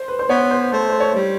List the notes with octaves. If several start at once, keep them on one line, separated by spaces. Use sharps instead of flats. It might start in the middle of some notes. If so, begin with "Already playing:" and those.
Already playing: C5
B4
C5
B3 C#5
C5
A3 C5
C5
C#5
G3